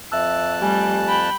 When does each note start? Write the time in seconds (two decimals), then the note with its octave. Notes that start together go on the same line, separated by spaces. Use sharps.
0.12 F2 E5 A5 E6 F#6
0.61 G3 A3 G4 G#5
1.08 G5 B5